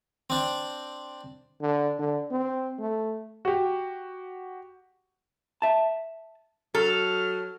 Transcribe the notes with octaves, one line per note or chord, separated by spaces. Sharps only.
C4 D4
D3
D3
C4
A3
F#4 G4
E5 A5
F#3 A4 F6